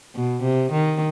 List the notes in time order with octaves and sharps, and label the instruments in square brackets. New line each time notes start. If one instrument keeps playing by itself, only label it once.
[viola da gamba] B2
C3
D#3